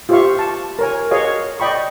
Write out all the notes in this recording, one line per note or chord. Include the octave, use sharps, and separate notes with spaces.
F4 G4 C5 E5 F5 C#6
A5 C#6
A#4 C#5 G#5
F#4 G#4 C#5 D#5 F5
D5 D#5 G5 B5 C#6